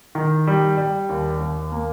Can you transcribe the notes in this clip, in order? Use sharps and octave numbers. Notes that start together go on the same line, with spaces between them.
D#3
G3
G3
D#2
D#2
A#3